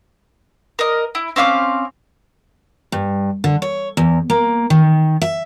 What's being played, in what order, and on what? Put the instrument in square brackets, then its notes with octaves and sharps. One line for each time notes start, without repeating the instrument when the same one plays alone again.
[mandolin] A#4 D#5
E4
C4 C#4 F5 D6
[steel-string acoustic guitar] G2
D3
C#5
E2
A#3
D#3
E5